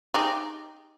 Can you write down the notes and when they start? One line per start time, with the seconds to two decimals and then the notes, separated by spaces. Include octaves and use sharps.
0.14 D#4 G4 G#4